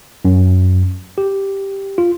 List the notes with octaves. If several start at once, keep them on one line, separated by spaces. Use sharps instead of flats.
F#2
G4
F4